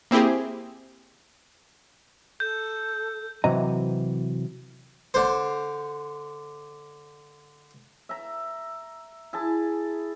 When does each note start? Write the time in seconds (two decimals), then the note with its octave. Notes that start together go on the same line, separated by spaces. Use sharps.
0.11 A#3 C4 E4 G4 G#4
2.40 A4 G6
3.44 C3 E3 F#3 C4 D#5 A#5
5.14 D3 C5
8.09 E5 A#5
9.33 E4 G#4 A5